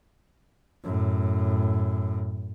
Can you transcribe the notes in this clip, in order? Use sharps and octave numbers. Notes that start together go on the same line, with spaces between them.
F#2 A2